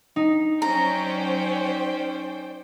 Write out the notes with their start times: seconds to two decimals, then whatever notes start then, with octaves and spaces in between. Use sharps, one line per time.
0.16 D#4
0.62 F#3 C#4 C5 D5 G5 A#5